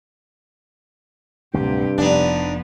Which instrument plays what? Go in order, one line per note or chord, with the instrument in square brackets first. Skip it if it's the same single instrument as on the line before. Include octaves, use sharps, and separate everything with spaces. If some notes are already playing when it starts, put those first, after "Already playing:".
[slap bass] D1 D2 [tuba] G2 [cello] C3 G4
[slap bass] F1 [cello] F3 B3 [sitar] D4 D#4